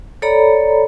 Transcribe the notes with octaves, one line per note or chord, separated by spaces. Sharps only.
A4 C#5 D5 A#5 B5